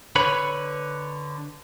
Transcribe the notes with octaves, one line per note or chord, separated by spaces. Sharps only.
D3 B4 C#5 B5